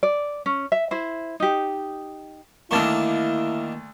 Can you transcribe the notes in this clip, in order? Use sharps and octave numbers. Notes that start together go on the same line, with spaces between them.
D5
C#4
E5
E4 C5
D#4 G4
D2 D#3 A#3 D4 E4 A5 C#6